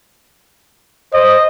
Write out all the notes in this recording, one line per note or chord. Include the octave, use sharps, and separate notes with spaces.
C5 D#5